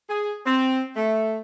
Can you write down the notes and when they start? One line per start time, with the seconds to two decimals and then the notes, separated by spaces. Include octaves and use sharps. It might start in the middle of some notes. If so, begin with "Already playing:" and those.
0.09 G#4
0.46 C4
0.96 A3